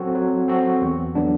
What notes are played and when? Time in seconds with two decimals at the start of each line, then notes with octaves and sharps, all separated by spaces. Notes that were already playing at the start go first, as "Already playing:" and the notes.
Already playing: F#3 C4 F#4 A4
0.15 F#3
0.48 C4 F#4 A4
0.82 E2
1.15 D3 F#3 B3 D4